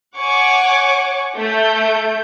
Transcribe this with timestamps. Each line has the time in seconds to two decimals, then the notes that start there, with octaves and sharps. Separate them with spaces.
0.18 C#5 F#5 G#5 C#6 D6
1.36 A3 G6